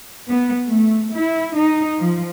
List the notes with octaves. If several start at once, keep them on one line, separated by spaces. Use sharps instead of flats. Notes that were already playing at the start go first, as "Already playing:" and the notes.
B3
A3
E4
D#4
F3